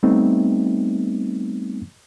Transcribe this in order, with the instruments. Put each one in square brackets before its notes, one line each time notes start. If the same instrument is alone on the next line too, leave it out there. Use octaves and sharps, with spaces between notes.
[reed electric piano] G3 A3 B3 C4 D#4